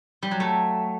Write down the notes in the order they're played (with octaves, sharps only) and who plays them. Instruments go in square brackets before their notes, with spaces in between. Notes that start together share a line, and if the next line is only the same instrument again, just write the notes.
[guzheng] G3
F#3
A3